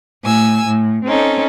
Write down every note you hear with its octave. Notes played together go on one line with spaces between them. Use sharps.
A2 G#5 E6
A2
C4 C#4 D#4 A4